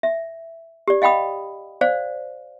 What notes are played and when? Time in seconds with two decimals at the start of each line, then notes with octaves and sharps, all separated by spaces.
0.03 E5
0.88 G4 D5
1.02 D#5 F5 G5 B5 D#6
1.81 C5 D5 F5